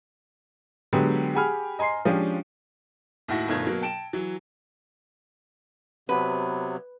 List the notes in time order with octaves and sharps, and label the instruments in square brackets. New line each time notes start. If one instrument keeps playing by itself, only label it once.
[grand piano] D3 F#3 G#3 B3 G4
G4 G#4 F#5 G#5 B5 F6
D#5 G#5 A#5 C6 C7
F3 G#3 C#4 D4 G4
[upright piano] D#2 A2 E4 F#4 A#6
G1 B2 D#3 A3 F4 G#6
B2 F#3 A#3
G5 A5 D7 E7
E3 F#3
[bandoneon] C3 F#3 B3 [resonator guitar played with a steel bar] B4